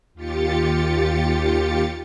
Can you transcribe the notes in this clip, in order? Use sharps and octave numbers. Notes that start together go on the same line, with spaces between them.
D#2 F4 G4 A6 C#7